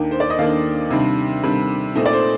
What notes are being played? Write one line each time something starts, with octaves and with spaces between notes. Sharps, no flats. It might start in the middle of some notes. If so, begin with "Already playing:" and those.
Already playing: D#2 D#3 A#3 D4 G5
C5
D5
D#5
D#2 D#3 A#3 D4 F5
C3 D#3 G3 D4
C3 D#3 G3 D4
A#2 A3 C4 D#4 D#5
D5
C5